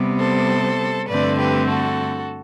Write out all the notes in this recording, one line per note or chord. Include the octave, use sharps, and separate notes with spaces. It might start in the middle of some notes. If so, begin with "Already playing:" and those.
Already playing: C3 G3 B3
A4 C5
G2 D3 A3 C4 B4 D5
G4 B4
F#4 A4